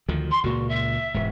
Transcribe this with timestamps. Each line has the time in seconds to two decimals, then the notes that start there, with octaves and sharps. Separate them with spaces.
0.08 D2 D#3 F3
0.31 C6
0.44 C#2 A#2 F#4
0.68 E5
1.14 E1 G#2